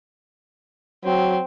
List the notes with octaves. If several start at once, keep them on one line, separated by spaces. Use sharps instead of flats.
F#3 C4